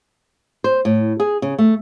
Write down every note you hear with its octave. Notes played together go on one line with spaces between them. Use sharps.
C5
A2
G#4
C#3
A3